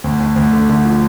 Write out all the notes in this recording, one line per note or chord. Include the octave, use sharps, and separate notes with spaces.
D2
D2
D2
D3
D3
F3